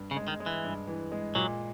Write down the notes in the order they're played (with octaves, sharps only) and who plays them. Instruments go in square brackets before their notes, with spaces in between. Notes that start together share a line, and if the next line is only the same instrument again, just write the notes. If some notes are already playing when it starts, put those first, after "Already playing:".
Already playing: [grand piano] G2
[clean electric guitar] C#3
[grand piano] G#3
[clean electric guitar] D#3
[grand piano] G#3
[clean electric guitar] E3
[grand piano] G2
E3
G#3
[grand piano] A#2 [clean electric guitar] F#3